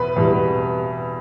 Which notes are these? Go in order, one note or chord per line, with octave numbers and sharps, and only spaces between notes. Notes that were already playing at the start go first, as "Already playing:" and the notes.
Already playing: E2 B2 B4
E2 B2 G3